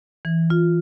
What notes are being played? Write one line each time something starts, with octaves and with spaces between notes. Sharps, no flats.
E3
F4